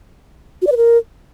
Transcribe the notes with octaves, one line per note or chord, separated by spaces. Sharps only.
F#4
D5
B4
A#4